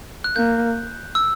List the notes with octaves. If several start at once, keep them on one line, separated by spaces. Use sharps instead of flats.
F#6
A#3 G6
E6